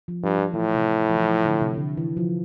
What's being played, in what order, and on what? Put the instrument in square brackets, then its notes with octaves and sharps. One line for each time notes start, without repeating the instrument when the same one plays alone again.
[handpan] F3
[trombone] G2 [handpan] F3
[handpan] F3
[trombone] A2 [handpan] E3
[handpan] C3
F3
E3
F3
D3
C3
D3
E3
F3